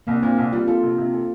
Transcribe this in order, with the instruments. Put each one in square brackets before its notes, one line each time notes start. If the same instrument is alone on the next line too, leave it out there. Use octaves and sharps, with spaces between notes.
[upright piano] C2 [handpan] A#3
[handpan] D4
[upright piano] A#2 [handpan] C4
[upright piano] C2
[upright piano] G3 [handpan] F4
[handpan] F4 [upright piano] A4
[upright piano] C3
C3
A4